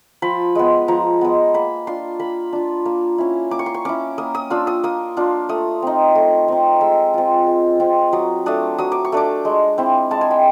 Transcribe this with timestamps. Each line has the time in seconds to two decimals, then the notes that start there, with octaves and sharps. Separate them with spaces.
0.22 F3 B5
0.55 G#3 B3
0.88 F3 A#5
1.21 G#3 B3
1.54 A#3 B5
1.87 D4 F4 C6
2.20 A#3 B5
2.53 D4 F4
2.86 A#3
3.18 C#4 E4
3.51 A#3 D6
3.59 C#6
3.66 C6
3.74 C#6
3.85 C#4 E4 D6
4.18 A#3 D#6
4.35 D#6
4.50 D4 F4 E6
4.67 D#6
4.84 A#3 D#6
5.17 D4 F4
5.49 A3 D#6
5.82 C4 D#4
6.15 A3
6.48 C4 D#4
6.81 G#3 E6
7.14 C4 F4
7.47 G#3
7.80 C4 F4
8.13 F#3 D#6
8.46 A3 D4 D#6
8.78 F#3 D#6
8.92 D6
9.05 C#6
9.12 A3 D4 D6
9.45 G#3
9.78 C4 E4
10.11 G#3 A5
10.21 G#5
10.31 G5